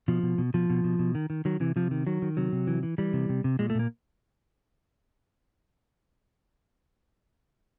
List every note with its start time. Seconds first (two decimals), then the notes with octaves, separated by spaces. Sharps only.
0.08 B2 F3
0.23 B2
0.38 B2
0.54 B2 F3
0.70 B2
0.84 B2
0.99 B2
1.15 D#3
1.30 D#3
1.45 D#3 F#3
1.60 C3 E3
1.76 C3 F3
1.91 D#3
2.07 D#3 F#3
2.22 D#3
2.37 C3 F#3
2.52 C3
2.67 E3
2.83 E3
2.98 E3 G3
3.13 C3
3.29 C3
3.44 C3
3.59 A#2 G#3
3.70 A3
3.75 A#2 A#3